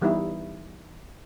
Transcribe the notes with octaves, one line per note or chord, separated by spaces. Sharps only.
E3 G3 B3 D#4 E4